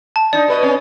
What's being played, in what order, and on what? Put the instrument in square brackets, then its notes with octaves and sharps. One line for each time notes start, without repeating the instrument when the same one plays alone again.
[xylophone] A5
[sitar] D4 D#4 [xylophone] D5
[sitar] B2 B4 D#5
C4 C#4